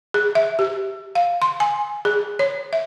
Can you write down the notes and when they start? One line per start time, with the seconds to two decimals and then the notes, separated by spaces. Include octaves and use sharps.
0.14 G#4
0.35 E5
0.59 G4
1.15 F5
1.42 C6
1.60 G#5
2.05 G#4
2.39 C#5
2.73 E5